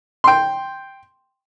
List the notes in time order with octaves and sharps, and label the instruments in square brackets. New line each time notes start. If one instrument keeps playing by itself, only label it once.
[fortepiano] G5 C6